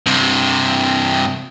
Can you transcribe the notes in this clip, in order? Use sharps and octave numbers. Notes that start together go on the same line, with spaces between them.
G2 C3